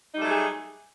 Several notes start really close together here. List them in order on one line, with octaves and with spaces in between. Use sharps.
D#4 G3 A3 F#3 G#4